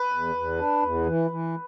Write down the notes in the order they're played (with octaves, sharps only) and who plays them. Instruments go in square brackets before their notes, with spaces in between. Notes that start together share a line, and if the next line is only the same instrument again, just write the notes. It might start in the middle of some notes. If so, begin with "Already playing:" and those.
Already playing: [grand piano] B4
[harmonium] E2
E2
D4
E2
E3
E3